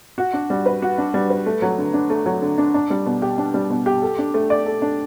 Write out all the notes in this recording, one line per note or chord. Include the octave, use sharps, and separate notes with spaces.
F#4
D4
G3
B4
F#4
D4
G3
B4
A3
F#3
D3
D4
A3
F#3
D3
D4
D4
G3
B2
G4
D4
G3
B2
G4
A4
D4
A3
D5
A4
D4